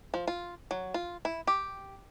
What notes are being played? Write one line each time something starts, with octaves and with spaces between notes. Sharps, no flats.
F3
F4
F#3
F4
E4
G4